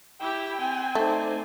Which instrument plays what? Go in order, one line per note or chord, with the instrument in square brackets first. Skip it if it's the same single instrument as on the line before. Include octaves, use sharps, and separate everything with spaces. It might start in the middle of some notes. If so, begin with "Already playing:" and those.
[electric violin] E4 G4 [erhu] G5
[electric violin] C4 G#5
[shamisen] A3 [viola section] D#4 C5 D5